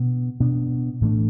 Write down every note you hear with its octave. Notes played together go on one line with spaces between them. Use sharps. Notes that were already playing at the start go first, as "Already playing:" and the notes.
Already playing: B2 B3 D4
B2 B3 D4
A2 E3 A3 D4